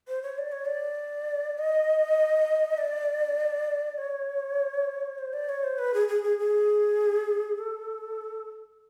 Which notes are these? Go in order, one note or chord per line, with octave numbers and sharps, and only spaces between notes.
C5
C#5
D5
C#5
D5
D#5
D5
C#5
C5
D5
C#5
C5
B4
G#4
G#4
G#4
G#4
A4